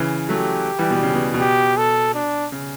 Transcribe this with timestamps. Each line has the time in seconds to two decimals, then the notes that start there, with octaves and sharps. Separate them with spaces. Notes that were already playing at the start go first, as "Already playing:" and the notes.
Already playing: C#3 E3
0.29 F#3 A3 G4
0.79 E3 G3
0.91 B2
1.03 C#3
1.14 B2
1.34 B2
1.40 G4
1.77 A4
2.15 D4
2.52 C#3